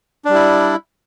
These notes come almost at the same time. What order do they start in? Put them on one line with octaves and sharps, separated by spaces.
D4 G3 E4